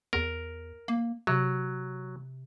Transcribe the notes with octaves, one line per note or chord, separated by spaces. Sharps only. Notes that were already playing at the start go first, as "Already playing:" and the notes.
E2 A#4
A#3
C3 F#3